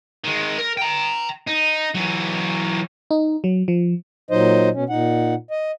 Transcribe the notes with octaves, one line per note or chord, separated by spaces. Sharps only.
D#3 G#3
A#4
G5 A#5
D#4
E3 F#3
D#4
F#3
F3
A#2 F#3 D#4 C5 D#5
B2 C#4
A#2 D#4 F#5
D#5